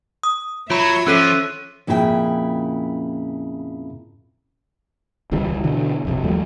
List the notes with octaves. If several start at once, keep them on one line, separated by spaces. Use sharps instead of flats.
D#6
F#3 F4 C#5 E5 B5
F3 C#4 A4 E6 F#6 B6 D#7
F2 A#2 C#3 E4 F#4 G5
D#1 C#2 E3 G3
B2 D3 E3
F1 B1 C3
D#2 F3 G3 A3